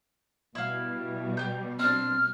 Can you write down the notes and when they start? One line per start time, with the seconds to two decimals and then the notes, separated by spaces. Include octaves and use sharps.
0.55 B2 G3 E4 F5
1.37 G4 G6
1.79 C4 D4 F6